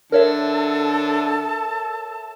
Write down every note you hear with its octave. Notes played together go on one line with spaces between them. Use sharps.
D3 A4 A#4 C#5 E5 A5